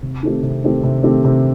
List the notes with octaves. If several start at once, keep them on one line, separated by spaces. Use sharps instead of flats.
C3
D#3 A3 C4 G4
C3
D#3 A3 C4 G4
C3
D#3 A3 C4 G4
C3